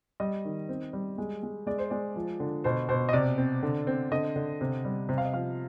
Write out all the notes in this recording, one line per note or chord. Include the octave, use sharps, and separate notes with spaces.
G3 D#5
D#3
C4
G3
G#3
G#3
G#3 D5
C5
G#3 D5
F3
D3
B2 C5
B2 C5
D#5
C3 D5
C4
D3
C4
D3 D#5
D3
C3
G3
C3
F5
D#5
F3 F5